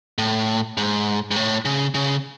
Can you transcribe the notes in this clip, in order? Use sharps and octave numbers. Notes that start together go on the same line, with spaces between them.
A2
G#2
G#2
A2
C#3
C#3